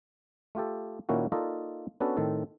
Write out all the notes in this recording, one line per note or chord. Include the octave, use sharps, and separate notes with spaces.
A3 F4 G4 A4
A#2 D#3 A#3 C#4 E4 F#4
A#3 D#4 F4 A4 D5 D#5
B3 C#4 D4 F#4 A4 B4
A2 D#3 C4 A4